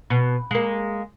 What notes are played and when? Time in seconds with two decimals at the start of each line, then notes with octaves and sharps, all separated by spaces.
0.10 B2
0.51 G#3 A#3